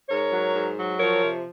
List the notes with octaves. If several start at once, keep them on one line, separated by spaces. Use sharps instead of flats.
G#2 A#4 C#5
F#3
G#2
F#3
F3 A#4 C#5
C3